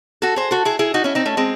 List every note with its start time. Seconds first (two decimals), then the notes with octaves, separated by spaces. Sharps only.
0.22 F#4 A4
0.36 G#4 C5
0.51 F#4 A4
0.65 E4 G#4
0.79 E4 G#4
0.94 D#4 F#4
1.04 C#4 E4
1.15 C4 D#4
1.26 A3 C#4
1.37 G#3 C4